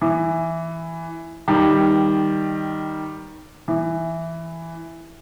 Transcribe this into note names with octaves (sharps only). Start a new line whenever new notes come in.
E3
D#3 G3
E3